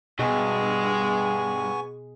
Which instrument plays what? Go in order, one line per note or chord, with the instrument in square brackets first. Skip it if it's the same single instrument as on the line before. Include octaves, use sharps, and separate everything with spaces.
[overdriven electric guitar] G2 [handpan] B2 G#4 D#5 [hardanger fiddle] G#3 [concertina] B3 G#5 C#6